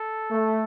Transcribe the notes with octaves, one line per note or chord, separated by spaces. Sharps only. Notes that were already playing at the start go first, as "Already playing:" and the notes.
Already playing: A4
A3